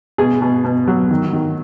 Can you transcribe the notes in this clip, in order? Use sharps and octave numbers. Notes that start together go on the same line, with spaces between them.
B2 G#4
B2
B2
F#3
D#3
D#3